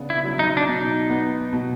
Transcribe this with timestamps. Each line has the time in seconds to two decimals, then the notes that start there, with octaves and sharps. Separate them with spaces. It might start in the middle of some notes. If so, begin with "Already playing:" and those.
Already playing: C#3 B3 D4
0.10 E4
0.24 F#3
0.39 D#4
0.57 D4
0.67 B2 D#4
1.10 B3
1.53 B2